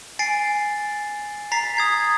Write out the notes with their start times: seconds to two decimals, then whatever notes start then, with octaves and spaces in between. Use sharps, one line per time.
0.19 G#5 A6 C7 D7
1.52 A#5 A6 B6 C7
1.77 D#6 G#6 C7